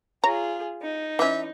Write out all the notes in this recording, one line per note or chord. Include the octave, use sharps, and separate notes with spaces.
F4 G#4 C#5 A#5
D#4
E3 C#4 E5